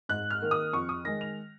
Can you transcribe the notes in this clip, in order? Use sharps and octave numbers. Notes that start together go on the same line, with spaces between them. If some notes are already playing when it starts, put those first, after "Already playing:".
G#2 F#6
F6
D#3 A#3
D#6
F2 C#6
D#6
D#3 G#3 A#6
F7